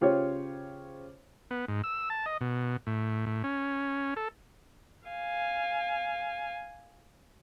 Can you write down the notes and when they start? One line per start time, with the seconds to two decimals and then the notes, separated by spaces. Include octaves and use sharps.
0.01 C#3 F4 G4 C5 C#5
1.51 B3
1.68 G#2
1.84 E6
2.10 A5
2.26 D#5
2.41 B2
2.87 A2
3.26 A2
3.44 C#4
4.16 A4
5.08 F5 G#5